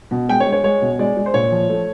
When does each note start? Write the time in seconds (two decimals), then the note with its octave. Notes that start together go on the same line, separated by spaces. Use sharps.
0.11 B2
0.29 G#3 G5
0.40 C#5
0.46 G#3
0.52 C#5
0.64 G#3 C#5
0.82 B2
0.99 G#3 D5
1.17 G#3
1.26 C5
1.34 A#2 C#5
1.52 F3
1.70 A3